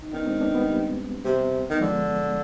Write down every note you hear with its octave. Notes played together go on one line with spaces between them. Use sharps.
D#4
D#3 B3 D4
G#3 C4
B3 D4
G3 B3
G3 B3
C3
D#3 B3
D3 F3 G#3